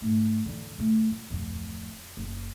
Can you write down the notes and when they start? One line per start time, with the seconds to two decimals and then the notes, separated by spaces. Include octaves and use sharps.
0.01 G#2 A3
0.45 D3 E3
0.78 C#3 A3
1.11 F4
1.30 D1 F2
2.17 F#1